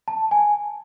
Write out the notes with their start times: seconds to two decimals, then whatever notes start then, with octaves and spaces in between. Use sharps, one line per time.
0.08 A5
0.31 G#5